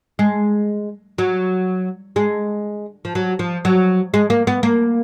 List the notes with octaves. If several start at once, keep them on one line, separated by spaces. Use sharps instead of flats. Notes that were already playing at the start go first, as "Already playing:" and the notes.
G#3
F#3
G#3
F3
F#3
F3
F#3
G#3
A#3
B3
A#3